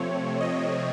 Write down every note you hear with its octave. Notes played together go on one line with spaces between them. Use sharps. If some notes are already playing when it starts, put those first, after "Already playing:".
Already playing: C3 F3 A3 C4 C#5
D#5